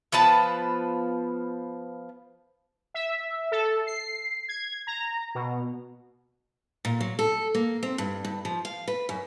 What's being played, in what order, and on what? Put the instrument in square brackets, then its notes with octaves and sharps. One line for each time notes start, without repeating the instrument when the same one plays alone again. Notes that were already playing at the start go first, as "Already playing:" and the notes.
[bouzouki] F3 B3 B4 A5
[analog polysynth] E5
A4
C7
G#6
A#5
B2
[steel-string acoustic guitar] A#2
F#3
A4
A#3
C4
G2
G2
F3
F5
B4
F#2